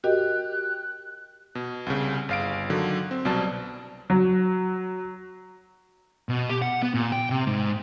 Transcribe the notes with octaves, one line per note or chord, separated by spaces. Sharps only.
F#4 G4 A#4 D#5 F#6
B2
C2 C#3
G1 F5 D7
D3 D#3 F#3
C4
C2 B2 F#3 D5 A5
F#3
B2
G4
F#5
B3
A#2
G5
C3
G#2